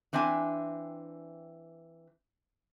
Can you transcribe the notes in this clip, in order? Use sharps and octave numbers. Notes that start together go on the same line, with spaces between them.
E3 C4 D4 E5 G#5